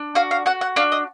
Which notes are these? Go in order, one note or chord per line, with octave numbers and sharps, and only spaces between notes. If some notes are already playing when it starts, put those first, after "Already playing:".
Already playing: D4
F#4 F5
F5
F#4 F#5
F#5
D4 F5
D#5